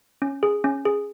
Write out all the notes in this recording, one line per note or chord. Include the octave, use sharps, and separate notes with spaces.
C#4
G#4
C#4
G#4